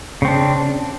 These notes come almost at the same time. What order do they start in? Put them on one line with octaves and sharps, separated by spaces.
C#3 C4 D4